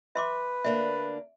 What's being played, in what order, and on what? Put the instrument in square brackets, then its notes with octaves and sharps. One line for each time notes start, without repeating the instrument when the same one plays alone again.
[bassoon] B4 [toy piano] E5 C6 D6
[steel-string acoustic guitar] D2 A#3 D4 [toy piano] E5